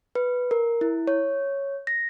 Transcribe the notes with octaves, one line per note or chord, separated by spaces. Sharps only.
B4
A#4
E4
C#5
A#6